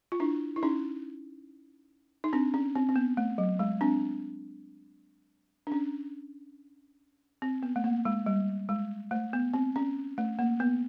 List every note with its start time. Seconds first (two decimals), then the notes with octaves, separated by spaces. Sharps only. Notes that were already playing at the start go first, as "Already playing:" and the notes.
0.12 F4
0.20 D4 E4
0.56 E4
0.63 C#4 D#4
2.24 D#4
2.33 C4 D4
2.54 C#4
2.75 C4
2.89 C4
2.96 B3
3.17 A3
3.38 F#3
3.59 G#3
3.81 C4 D4
5.67 D4
5.72 C#4
7.42 C4
7.63 B3
7.76 A3
7.84 A#3
8.05 G#3
8.26 G3
8.69 G#3
9.11 A3
9.33 B3
9.54 C4
9.76 C#4
10.18 A3
10.39 A#3
10.60 B3